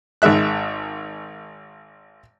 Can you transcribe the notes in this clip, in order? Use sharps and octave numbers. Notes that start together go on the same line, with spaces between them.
G#1 D#3 G#3 E5 F#6